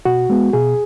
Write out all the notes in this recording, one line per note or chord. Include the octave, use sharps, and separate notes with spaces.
B2 F#4
G#3 B3
B2 G#4